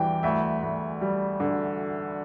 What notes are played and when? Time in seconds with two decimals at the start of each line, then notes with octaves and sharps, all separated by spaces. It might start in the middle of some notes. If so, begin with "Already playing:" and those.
Already playing: E2 E3 G3 G5
0.23 D2 E5
0.63 D2
1.01 G3
1.40 D3